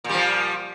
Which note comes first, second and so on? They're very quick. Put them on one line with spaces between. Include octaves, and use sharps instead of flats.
A#2 G3 F3